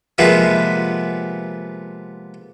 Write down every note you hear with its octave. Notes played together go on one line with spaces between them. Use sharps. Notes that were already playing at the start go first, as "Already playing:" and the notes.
C3 F3 G#3 A#3 B3